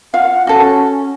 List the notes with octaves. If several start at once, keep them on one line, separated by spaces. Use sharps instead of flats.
F4 F5 F#5
C#4 F#4 A4